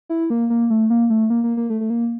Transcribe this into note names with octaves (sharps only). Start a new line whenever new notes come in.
E4
A#3
A#3
A3
A#3
A3
A#3
A#3
A#3
A3
A3
A#3